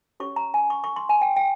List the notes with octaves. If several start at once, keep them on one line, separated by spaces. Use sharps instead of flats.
C#4 G4 C#5 C#6
A#5
G#5
C#6
C#6
C6
G#5
G5
G5